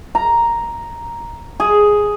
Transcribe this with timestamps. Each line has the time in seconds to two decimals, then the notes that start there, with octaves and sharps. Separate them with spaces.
0.15 A#5
1.60 G#4